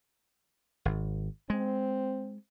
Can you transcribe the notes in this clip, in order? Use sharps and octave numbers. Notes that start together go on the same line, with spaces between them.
G#1
G#3 C4